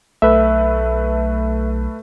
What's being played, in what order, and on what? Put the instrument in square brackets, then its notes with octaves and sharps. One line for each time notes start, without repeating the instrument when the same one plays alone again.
[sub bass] B1 [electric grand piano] A3 A4 B4 [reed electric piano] E5